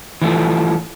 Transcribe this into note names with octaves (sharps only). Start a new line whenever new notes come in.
E3 F3 A3